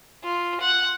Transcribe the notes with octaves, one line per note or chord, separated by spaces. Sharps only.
F4
F#5